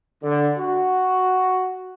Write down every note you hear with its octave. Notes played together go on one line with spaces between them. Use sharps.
D3
F#4